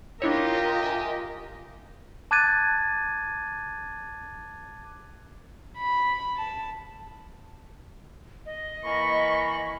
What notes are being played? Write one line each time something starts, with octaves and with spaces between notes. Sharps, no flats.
D4 E4 F4 G4 A#4 C#5 D#5
E5 G#5
A5 D6 F#6 G#6 A6 D#7
B5
A5
D#5
E3 A#3 B5 C#6